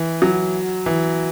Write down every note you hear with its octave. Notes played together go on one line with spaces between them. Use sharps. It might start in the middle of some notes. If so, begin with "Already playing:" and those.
Already playing: E3
F#3
E3